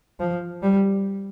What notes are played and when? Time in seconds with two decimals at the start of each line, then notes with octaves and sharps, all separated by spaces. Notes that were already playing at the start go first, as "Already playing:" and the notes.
0.20 F3
0.62 G3